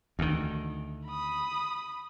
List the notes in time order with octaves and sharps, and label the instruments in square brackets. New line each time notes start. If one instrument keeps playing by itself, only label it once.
[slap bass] D2 D#3
[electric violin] B5 D#6